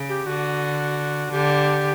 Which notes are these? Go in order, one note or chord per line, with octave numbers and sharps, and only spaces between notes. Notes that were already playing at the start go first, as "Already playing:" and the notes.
Already playing: C#3
G4
D3 F#4
D3 G4